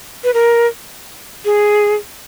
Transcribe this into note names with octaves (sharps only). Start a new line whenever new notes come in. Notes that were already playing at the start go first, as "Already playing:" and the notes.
B4
A#4
G#4